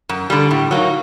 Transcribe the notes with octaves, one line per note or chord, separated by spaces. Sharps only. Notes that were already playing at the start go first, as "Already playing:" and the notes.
F#2
D3 G3
A2
F#3 A#3 D#4